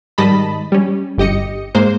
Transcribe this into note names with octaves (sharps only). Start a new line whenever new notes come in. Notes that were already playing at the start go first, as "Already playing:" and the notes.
G#2 D#3 G3 D#5 A5 B5
G3 C#4
G1 G4 D#5 C#7
G#2 G#3 A#3 C5